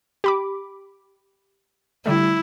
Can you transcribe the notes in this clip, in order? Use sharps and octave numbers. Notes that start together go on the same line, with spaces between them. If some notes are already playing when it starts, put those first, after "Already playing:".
G4 B5 D6
D3 G3 A3 E4